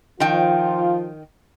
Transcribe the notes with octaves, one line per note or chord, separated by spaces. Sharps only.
D#3 F3 F4 G5